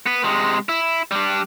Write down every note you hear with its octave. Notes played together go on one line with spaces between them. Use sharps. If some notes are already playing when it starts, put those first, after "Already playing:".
B3 B4
C3 G#3
E4
G3 D4